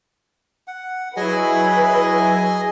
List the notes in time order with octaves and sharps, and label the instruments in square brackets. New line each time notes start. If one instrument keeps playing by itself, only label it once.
[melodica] F#5
[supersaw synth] F#3 E4 [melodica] G#4 D#5 G#5 [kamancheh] B4